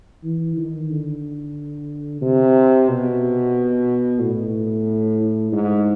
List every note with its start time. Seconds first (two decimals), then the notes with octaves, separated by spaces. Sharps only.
0.24 E3
0.57 D#3
0.89 D3
2.21 C3
2.89 B2
4.19 A2
5.52 G#2